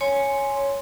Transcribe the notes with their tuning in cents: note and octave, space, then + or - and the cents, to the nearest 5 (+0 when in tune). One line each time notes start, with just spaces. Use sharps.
C#5 +0 G#5 +0 C6 +0